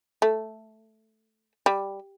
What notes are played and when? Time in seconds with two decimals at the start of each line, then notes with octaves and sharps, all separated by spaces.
0.22 A3
1.66 G3